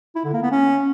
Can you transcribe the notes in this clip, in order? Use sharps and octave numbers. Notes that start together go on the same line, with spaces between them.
E4
D3
A#3
B3
C#4